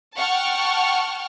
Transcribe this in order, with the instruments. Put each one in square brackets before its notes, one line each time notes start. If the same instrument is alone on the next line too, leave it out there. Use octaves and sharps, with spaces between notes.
[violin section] F#5 G5 A5 C#6 F6